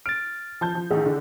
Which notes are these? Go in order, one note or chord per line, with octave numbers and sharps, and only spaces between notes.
F6 A6 D7
F3 A5 G6
F3
A1 D#3 G#4
D3